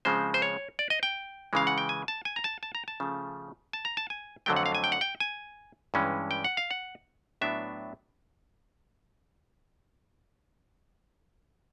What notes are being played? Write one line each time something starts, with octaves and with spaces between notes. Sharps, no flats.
C#3 F3 G#3 C4 C5
C5
C#5
D5
D#5
G5
C#3 E3 G#3 F5
F#5
G5
G#5
A5
G#5
A#5
A5
A5
A#5
A5
C#3 F3 A3
A5
A#5
A5
G#5
F2 D3 F#3 A3 G5
F#5
F5
G#5
G5
F#5
G5
G#5
G2 E3 G#3 C#4
G5
F#5
F5
F#5
A2 F#3 B3 D4 E5